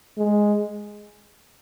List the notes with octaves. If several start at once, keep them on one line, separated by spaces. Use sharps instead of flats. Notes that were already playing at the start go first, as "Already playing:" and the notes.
G#3